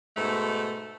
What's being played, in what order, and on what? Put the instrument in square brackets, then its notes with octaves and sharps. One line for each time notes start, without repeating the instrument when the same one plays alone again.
[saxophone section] G#2 B2 A3